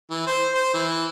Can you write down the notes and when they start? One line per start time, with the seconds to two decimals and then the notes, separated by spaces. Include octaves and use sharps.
0.11 E3
0.27 C5
0.54 C5
0.74 E3